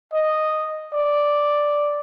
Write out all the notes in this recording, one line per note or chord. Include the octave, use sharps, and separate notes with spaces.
D#5
D5